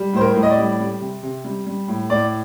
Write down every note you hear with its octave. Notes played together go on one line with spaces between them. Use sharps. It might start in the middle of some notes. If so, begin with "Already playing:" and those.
Already playing: G3
A2 C5
A#4
A2
D#5
D5
G3
G3
C3
C3
G3
G3
A2
A2 D5